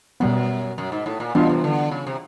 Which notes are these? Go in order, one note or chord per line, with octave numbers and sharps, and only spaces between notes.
F#2 B2 G3 B3
F#2
G#2
A2
A#2
B2 E3 G3 B3 D4 F4
C3
D3
C#3
C3